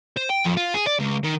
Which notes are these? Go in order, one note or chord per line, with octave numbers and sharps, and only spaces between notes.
C5
G5
F2
F4
G#4
D5
C#2
D#3